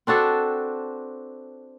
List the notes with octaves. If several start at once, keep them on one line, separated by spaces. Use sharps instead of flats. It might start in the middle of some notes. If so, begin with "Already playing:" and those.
C4 D4 F#4 A4